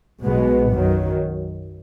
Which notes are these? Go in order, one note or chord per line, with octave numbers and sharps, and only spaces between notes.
B1 B2 G#3 B3
F#2 D#3 F#3